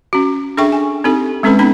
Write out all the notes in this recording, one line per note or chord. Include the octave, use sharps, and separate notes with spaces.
C#4 F#4
D4 G#4 A4 E5 G5 C#6
G#5
C4 D#4 G4 A4
G#3 C4 C#4 A4 B4 B5
B3 C#4 D#4 B5